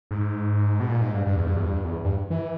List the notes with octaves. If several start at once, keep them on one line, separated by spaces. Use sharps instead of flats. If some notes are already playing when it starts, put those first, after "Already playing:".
G#2
B2
A#2
G#2
G2
G2
E2
G2
E2
G2
E2
G2
E3